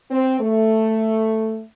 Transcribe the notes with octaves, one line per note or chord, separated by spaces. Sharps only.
C4
A3